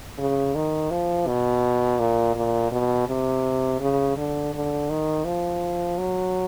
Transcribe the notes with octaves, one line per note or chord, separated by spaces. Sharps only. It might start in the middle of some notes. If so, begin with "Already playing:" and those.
C#3
D#3
F3
B2
A#2
A#2
B2
C3
C#3
D3
D3
D#3
F3
F#3